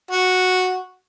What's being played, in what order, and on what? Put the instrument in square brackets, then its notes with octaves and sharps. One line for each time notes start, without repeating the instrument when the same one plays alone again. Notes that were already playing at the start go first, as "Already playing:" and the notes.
[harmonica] F#4